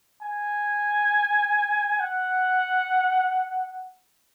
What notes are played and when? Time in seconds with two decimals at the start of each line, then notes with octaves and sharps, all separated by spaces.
0.22 G#5
2.00 F#5